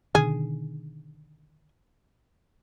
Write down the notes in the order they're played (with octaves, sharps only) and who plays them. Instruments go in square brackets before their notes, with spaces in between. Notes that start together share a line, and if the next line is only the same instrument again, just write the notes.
[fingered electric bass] B2 D3 D#3 [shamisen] G#4